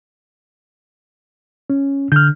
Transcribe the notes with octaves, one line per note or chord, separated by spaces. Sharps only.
C#4
D3 F6 G6